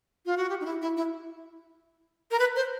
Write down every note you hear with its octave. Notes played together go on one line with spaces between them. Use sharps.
F4
F#4
G4
D#4
E4
E4
E4
A#4
B4
C5